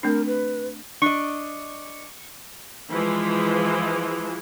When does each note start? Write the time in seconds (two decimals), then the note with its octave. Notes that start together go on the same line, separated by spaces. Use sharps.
0.03 A3 C4 D4 A#4
0.26 B4
1.02 D4 D#5 C#6
2.89 E3 F3 G#3